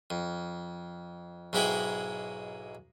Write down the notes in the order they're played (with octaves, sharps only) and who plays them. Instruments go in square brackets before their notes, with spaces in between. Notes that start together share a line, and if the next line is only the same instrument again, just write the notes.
[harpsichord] F2
B1 G#2 G#3 E4 G5 B5